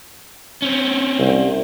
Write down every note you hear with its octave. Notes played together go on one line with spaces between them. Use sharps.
C4 C#4
C2